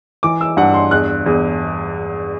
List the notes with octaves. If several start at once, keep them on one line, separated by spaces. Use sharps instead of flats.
E3 D6
E6
G2 F#5
C6
E2 F#6
E2